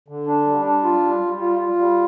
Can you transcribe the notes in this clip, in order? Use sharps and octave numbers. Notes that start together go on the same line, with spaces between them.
D3
D4
G3
D4
F4
G3
G3
F4
F4
G3